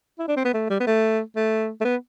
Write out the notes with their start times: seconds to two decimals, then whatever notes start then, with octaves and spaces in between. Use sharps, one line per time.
0.19 E4
0.28 D4
0.37 C4
0.45 B3
0.54 A3
0.70 G3
0.80 B3
0.87 A3
1.36 A3
1.81 A3
1.85 B3